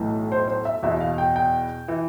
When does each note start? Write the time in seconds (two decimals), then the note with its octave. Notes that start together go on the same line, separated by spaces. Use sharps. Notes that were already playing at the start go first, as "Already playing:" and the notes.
Already playing: B1 A2 E3
0.32 C5
0.48 C5
0.65 E5
0.83 E2 B2 E5
1.01 F5
1.18 G5
1.36 G5
1.88 E3